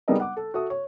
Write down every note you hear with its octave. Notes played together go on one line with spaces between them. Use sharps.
G3 G#3 B3 D#4 A#4 D#5
F#5 D6
A4
F#4 A4 E5 D#6
C#5